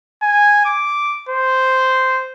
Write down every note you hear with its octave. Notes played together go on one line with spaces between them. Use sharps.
G#5
D6
C5